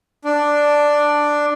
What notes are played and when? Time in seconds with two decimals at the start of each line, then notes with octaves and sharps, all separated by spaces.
0.24 D4